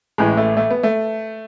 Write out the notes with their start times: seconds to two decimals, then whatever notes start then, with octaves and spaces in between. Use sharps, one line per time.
0.18 A1 A2 E3 G#3
0.37 A3
0.57 A3
0.71 B3
0.83 A3